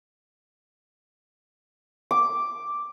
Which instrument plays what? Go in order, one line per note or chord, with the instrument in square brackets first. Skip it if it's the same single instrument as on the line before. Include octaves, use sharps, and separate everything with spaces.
[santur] D6